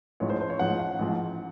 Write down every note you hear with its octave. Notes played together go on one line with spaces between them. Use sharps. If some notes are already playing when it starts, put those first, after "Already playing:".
A1 G#2 F3 C#5
C5
C5
C#5
A1 G#2 F3 F#5
F#5
A1 G#2 F3